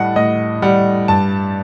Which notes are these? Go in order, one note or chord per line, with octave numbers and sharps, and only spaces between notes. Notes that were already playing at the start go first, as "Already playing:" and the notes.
Already playing: A2 G3 D#5 F#5 A5
A2 D#5
G3 F#5
G2 A5